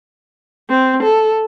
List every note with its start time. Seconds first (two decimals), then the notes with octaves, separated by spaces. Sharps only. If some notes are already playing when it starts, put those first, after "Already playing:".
0.70 C4
1.03 A4